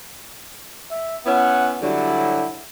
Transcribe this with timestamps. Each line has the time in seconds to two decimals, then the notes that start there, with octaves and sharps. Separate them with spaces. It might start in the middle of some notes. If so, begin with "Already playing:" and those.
0.91 E5
1.26 B3 C#4 E4 F#5
1.82 D3 F#3 G3 E4